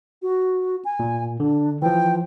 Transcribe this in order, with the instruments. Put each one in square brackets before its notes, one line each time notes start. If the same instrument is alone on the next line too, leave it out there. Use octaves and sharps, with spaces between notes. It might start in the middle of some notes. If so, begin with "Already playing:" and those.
[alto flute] F#4
G#5
[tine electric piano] A#2
[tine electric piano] D3 [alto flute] D4
[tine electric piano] E3 F3 [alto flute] G5